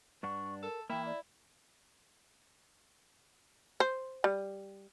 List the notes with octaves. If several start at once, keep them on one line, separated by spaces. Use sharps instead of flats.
G2 D4 F#5 C#6
A4 A#4
E3 A#3 E4 G5
D5
C5
G3